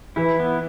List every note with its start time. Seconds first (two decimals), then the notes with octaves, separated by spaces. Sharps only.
0.16 E3 E4
0.39 B3